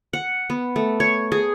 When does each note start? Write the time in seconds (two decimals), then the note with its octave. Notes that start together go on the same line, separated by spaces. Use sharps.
0.13 F#5
0.50 B3
0.76 A3
1.00 C#5
1.32 G#4